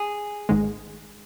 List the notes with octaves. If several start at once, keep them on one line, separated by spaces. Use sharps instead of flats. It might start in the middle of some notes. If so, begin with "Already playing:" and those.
Already playing: G#4
G#1 G#2 D#3 G#3